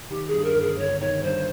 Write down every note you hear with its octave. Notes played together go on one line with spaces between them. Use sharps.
D#3 G4
G#4
G2
A#4
G1
G#4
G1 C#5
D#3 C#5
G2 C5